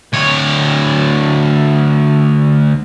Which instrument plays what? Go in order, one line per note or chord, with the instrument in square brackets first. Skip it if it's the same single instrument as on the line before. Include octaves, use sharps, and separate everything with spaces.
[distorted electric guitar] D2 C#5